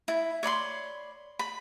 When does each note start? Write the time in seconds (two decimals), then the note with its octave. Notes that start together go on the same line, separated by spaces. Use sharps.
0.08 E4
0.43 C#5 D5 B5 C6
1.39 B5